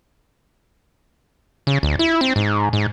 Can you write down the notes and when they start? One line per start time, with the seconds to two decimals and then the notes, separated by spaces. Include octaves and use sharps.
1.67 C#3
1.83 D2
1.99 E4
2.21 C4
2.36 G#2
2.73 G#2